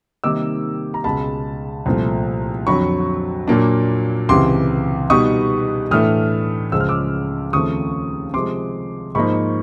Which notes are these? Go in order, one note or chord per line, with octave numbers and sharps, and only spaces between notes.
C3 D#3 G3 A#3 D#4 D6 E6
A#5
C#2 B2 G#3 A5 B5
C2 A#2 F3 A3
F2 D3 F#3 B5 C#6
A#2 F#3 A#3 D4
C#2 C3 E3 C6 D6
B2 G3 B3 D#4 C#6 D#6
A2 E3 A3 D4 D#6 F6
C#2 C#3 F3 G#3 E6
F6
D6 E6
D#2 C#3 F3 A3 C4 C#6 D#6
C3 F3 G#3 C6 D6
G#2 F3 A#3 D#4 B5 C#6